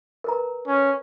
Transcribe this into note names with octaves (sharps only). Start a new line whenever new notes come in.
A#4 B4 A#5
C#4